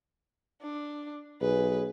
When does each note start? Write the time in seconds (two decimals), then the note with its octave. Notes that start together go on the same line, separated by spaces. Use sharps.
0.62 D4
1.41 B1 G#4 B4